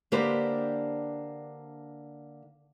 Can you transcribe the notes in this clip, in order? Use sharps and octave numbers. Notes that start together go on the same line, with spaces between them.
D3 A#3 D4 G4 B4 C5